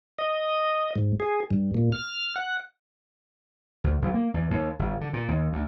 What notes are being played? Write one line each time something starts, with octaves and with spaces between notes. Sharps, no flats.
D#5
G#2
G#4
G2
A#2
F6
F#5
D2
B1
A#3
E2
D#2
G1
D3
A#2
D#2
D2